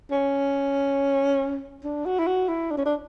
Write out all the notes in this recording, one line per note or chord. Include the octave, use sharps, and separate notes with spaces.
C#4
D4
F#4
E4
F#4
E4
D4
C#4
D4